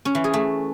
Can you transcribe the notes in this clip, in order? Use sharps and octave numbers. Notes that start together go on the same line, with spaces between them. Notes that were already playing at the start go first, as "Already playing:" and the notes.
C#4
E3
G#4
A3